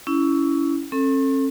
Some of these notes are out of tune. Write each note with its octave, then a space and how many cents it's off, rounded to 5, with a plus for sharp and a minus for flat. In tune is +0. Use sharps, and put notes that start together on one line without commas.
C#4 +20 E4 +0
C#4 -45 A4 +15